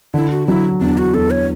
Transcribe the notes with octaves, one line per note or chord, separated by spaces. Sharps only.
D3 E4
F#4
F#3 E4
E2 D4
F#4
E2 A4
C#5